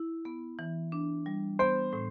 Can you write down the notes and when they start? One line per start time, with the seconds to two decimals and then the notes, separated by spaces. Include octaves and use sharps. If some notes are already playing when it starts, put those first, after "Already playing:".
Already playing: E4
0.25 B3
0.59 E3
0.92 D4
1.26 G3
1.59 B3 C5
1.93 A2